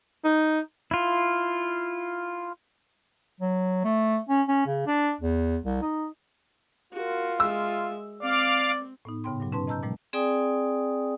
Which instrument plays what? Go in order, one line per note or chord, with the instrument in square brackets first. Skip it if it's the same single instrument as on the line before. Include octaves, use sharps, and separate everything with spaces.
[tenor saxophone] D#4
[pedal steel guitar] E4 F4
[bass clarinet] F#3
A3
C#4
C#4
C#3
D4
E2
C2
D#4
[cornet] F4 [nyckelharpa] F#4 A#4
[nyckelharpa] G#3 E5 [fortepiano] E6
[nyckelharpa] C4 [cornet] D5 [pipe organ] F5 D6 F6
[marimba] A2 B3 D#4
G#2 C#3 B3 G5 C6
G2 A#2 F#3
C3 C#4 D#4 B4 A5 C6
D#5 A5 A#5 E6 G6
A#2 F3 G3 A3
[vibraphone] C4 G#4 D5 G5 G#5 D#6